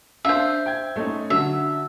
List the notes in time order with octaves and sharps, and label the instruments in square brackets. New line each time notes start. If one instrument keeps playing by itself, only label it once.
[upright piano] D4 F5 [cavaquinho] C5 E5
[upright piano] G5 G#6
A3 C#4 D#4
[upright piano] D3 F#3 [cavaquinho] E5